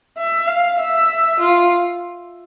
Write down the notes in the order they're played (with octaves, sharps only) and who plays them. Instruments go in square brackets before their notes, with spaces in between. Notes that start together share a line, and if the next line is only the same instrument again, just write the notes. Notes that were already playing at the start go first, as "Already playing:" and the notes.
[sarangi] E5
F5
E5
F4